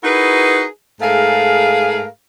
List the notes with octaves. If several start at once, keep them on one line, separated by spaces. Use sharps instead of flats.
D#4 E4 F#4 G#4 A#4 B4
G#2 A3 G#4 A#4 F5